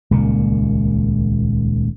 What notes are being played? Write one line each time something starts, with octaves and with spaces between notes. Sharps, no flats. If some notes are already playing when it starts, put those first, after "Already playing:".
D#1 C#2 A#2